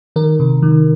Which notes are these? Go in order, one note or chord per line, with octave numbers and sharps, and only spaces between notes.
D#3 A#4
C3
D#3